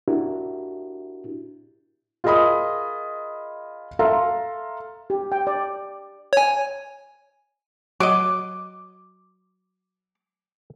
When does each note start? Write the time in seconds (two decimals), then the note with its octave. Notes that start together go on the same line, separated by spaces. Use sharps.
0.08 D4 E4 F#4 G4 A#4
2.24 F4 G#4 A#4 D#5 B5 D#6
3.99 A4 E5 F5 A#5 C6
5.10 G4
5.32 G5
5.47 D5
6.33 C#5 G#5
8.00 F#3 D#5 D6